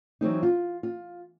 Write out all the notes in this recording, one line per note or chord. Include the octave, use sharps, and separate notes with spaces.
E3 F#3 C4 D#4
F4
F4